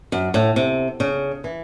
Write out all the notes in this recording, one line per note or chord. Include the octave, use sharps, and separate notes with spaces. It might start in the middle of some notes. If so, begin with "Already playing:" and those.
F#2
A2
C3
C#3
E3